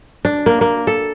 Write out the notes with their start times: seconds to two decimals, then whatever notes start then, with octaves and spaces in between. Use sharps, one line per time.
0.25 D4
0.46 A#3
0.61 A#3
0.87 A4